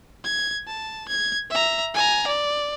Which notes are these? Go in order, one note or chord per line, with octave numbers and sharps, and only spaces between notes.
G#6
A5
G#6
E5 A#5
G#5 A#5
D5